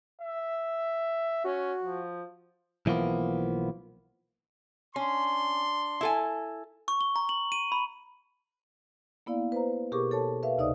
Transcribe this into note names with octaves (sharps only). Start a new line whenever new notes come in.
E5
C#4 F#4
F3
B1 E3 F3 A#3 B3
C#4 D4 C6
E4 A4 G#5
C#6
G7
A#5
F#7
D#7
B5
A#3 B3 E4 D5 F5
B4 C5 A#5
B2 G4 G#4 A#4 C#6 D6
A4 C#5 A5
B4 E5 F5
D2 C3 D#4 D5 D#5 D#6